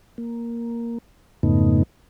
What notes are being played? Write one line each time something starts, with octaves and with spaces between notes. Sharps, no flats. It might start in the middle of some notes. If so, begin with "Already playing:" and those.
A#3
F2 G#2 C#3 A3 B3 D#4